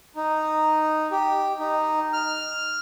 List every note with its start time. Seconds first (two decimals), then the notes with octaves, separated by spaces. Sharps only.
0.16 D#4
1.12 G4
1.59 D#4
2.13 F6